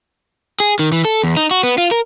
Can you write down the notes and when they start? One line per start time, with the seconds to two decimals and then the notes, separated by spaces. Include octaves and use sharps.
0.60 G#4
0.79 D#3
0.92 E3
1.05 A4
1.24 E2
1.37 D#4
1.51 F#4
1.63 B3
1.78 F4
1.91 A#4